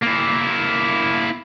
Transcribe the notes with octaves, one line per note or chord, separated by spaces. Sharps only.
A#3 E4